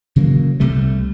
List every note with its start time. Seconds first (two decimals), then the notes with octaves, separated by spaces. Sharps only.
0.16 C#3 E3 F#3 A#3
0.60 C2 C3 G3 A3